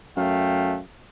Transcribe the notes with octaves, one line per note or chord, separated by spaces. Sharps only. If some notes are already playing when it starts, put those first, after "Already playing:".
F#2 A3 F5 G5